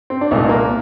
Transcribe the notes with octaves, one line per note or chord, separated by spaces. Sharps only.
C4
D4
C2 A#2 A3 D#4
A#3